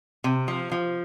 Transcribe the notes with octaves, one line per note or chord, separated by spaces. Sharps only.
C3
F3
F3